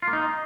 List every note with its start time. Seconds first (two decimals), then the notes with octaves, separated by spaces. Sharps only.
0.02 F4
0.08 A#3
0.13 D#4